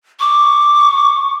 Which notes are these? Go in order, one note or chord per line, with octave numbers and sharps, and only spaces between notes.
C#6 D6